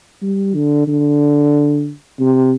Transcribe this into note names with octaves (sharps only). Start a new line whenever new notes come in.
G3
D3
D3
C3